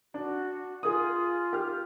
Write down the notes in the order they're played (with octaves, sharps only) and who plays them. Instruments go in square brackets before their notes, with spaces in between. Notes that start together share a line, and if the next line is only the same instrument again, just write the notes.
[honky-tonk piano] D4 [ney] F#4
[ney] F4 [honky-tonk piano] G#4 D#6
[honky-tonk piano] G4 F6